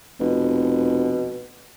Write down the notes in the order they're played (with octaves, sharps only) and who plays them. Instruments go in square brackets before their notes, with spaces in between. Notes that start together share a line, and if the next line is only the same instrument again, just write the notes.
[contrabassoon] F1 [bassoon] B2